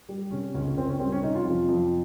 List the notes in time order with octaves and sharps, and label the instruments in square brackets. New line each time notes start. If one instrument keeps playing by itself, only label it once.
[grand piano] G3
C3 C#4
C#2 C#4
C#4
C#2 C4
C#4
G3 C4
C#4
C3 D#4
F4
F2
F2